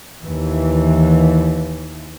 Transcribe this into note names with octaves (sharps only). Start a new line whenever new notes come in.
D#2 E3